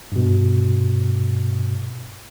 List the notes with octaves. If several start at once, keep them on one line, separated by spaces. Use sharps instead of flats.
G2 B2